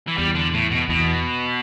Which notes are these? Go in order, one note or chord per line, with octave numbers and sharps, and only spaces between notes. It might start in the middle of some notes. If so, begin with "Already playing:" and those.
E3
E2 G3
D3
A2
B2
E2 B2